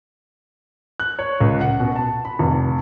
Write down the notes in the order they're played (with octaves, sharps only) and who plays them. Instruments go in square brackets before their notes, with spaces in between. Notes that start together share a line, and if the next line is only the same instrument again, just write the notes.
[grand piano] F#6
C#5
C#2
F#5
B2
A5
B5
F1